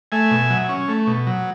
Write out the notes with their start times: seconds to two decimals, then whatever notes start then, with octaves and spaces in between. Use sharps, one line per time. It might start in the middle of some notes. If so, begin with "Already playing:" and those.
0.12 A3 E5 G#5
0.31 B2
0.50 F#3
0.69 C#4
0.88 A3
1.07 B2
1.27 F#3